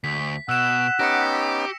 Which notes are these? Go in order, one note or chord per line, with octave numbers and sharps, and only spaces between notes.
D2 B6
B2 F#5 E6 E7
B3 C#4 D#4 G4 A#6 C#7